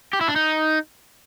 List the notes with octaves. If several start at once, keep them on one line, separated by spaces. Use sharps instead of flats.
G4
E4
D4
D#4